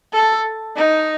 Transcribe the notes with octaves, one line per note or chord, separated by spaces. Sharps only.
A4
D#4